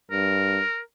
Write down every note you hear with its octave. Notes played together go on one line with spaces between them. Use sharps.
G2 A#4